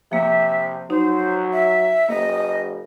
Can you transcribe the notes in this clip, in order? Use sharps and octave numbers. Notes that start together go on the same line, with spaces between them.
C3 F3 A#3 E5
F#3 D#4 C5
E5
F#1 A#3 D#5